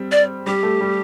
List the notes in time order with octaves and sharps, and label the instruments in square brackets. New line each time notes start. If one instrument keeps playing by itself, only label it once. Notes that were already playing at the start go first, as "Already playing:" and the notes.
Already playing: [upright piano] G3 C4
[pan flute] D5
[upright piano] G3 [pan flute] G4
[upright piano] A3
G3